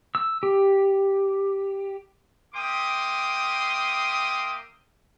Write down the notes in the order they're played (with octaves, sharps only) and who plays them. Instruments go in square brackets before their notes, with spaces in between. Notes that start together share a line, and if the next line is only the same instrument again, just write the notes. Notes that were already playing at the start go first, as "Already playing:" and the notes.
[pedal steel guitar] E6
G4
[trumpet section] A#3 E5 G5 C6 D6 D#6